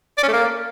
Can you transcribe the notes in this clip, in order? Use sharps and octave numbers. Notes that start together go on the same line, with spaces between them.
D5
C#4
A3
A#3